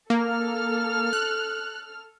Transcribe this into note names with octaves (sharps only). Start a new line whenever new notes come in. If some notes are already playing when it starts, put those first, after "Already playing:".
A#3 A4 F6
F#6